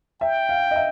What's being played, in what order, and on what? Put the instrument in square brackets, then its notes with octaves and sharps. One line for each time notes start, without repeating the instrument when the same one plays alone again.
[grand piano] E5 [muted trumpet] G5
[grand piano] F5
D#5
E5